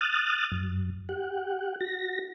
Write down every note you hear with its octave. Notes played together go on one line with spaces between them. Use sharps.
D#6 F6 F#6 A6
F#2
G4 F#5
F#4 A#6